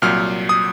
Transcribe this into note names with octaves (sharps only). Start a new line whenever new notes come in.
C2 A#2 F#3 F6
D#6